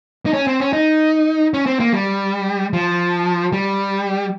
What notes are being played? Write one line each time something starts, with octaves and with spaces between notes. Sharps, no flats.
D#4
C#4
C4
C#4
D#4
C#4
C4
A#3
G3
F3
G3